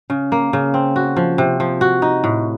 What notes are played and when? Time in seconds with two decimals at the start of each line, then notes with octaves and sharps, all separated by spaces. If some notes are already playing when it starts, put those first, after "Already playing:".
0.10 C#3
0.32 A#3
0.53 C#3
0.74 C4
0.96 F#4
1.16 F3
1.38 C3
1.60 F3
1.81 F#4
2.02 D#4
2.24 A2